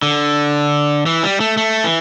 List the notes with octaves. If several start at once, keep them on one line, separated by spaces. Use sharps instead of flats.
D3
E3
G3
A3
A3
E3